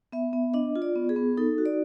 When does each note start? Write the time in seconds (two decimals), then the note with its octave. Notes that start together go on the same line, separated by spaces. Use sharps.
0.12 B3 E5
0.33 B3
0.54 D4 D#5
0.76 F4
0.82 D5
0.95 B3
1.09 G#4
1.16 B3
1.37 D#4 A4
1.58 F#4
1.66 D5